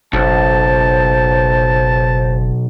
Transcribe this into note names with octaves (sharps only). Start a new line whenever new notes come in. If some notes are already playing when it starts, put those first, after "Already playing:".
F#1 B1 C5 A5